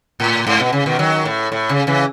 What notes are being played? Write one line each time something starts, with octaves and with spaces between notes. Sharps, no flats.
A2
G#2
B2
C#3
B2 D#3
D#3 F#3
A2
A2
C#3
C#3 E3